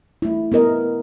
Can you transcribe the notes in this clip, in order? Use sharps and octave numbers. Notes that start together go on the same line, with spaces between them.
A3 E4
B3 E4 A#4 D#5